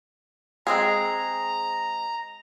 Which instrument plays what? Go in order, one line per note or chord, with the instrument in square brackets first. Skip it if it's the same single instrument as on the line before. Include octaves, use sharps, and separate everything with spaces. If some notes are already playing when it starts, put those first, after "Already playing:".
[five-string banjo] G#3 C4 G#4 [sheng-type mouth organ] A#5